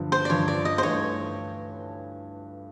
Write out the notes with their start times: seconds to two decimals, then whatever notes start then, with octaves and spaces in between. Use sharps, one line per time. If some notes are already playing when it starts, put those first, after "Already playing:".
Already playing: G2 D3 F3
0.12 C5
0.25 D5
0.30 G2 D3 F3 C#5
0.48 D5
0.65 D#5
0.78 C5
0.82 G2 E3 A3 C#5